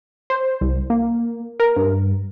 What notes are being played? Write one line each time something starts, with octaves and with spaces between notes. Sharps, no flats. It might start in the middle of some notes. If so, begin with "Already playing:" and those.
C5
C2
A#3
A#4
G2